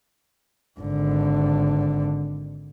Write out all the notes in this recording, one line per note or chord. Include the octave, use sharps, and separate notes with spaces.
G#1 D3